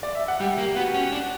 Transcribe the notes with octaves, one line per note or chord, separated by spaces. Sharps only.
D5
E5
F#5
G3 G4 G5
A#3
B3 F#4 F#5
C#4
D4